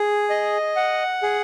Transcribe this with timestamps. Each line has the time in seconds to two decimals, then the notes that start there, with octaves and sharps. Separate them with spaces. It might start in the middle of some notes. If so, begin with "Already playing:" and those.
Already playing: G#4
0.30 D#5
0.76 F#5
1.23 G#4